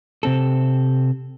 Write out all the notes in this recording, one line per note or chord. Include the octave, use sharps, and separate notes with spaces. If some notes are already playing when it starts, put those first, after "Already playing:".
C3 C4 A4